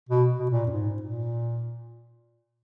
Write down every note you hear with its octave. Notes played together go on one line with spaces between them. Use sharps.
B2
B2
A#2
F#2
G#2
A#2